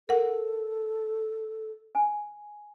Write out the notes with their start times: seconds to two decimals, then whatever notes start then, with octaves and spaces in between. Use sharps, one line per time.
0.09 A4 A#4 F#5
1.95 G#5